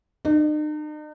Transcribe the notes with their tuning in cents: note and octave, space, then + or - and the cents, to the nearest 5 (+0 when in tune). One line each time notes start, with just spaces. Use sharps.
D#4 -45